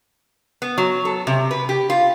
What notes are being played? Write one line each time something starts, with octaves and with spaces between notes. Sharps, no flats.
B3
F#3
A4
C3
B4
G4
F4